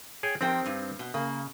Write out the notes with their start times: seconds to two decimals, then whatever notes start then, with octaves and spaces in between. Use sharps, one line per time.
0.23 G#4 C#5 G5
0.41 F3 C4 D#4 G4 A#4 G5
0.66 G2
0.99 B2
1.14 C#3 A#3